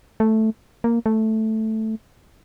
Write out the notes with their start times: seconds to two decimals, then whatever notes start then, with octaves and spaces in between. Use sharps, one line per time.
0.20 A3
0.84 A#3
1.06 A3